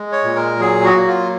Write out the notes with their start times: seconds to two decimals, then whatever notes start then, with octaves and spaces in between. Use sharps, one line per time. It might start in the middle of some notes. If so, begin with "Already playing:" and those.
Already playing: G#3
0.12 C#5
0.24 A#2
0.36 A#4
0.60 F#3 G#4
0.84 F#4
0.96 A#3
1.08 F4